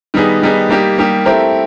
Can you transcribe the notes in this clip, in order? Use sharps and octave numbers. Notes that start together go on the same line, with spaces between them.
D#3 G3 B3 D#4 G#4
D#3 G3 B3 D#4 G#4
G3 A#3 D#4 G4
G3 A#3 D#4 G4
A3 C4 E4 G4 A#4